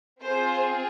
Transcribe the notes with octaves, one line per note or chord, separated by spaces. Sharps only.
C4 F4 G#4 C5